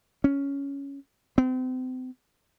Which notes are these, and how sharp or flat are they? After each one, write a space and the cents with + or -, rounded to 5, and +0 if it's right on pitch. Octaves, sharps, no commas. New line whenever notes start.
C#4 +10
C4 -35